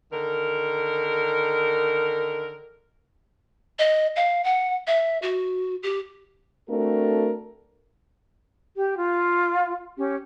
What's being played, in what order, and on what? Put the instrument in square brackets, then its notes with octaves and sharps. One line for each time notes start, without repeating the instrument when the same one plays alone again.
[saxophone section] D3 D#3 A#4
[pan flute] D#5
F5
F#5
E5
F#4
G4
[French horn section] A3 C4 D4 F#4 A4 A#4
[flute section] G4
F4
C#4 G4